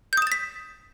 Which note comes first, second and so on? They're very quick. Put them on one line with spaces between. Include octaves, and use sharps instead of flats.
G6 D#6 E7 A6 B6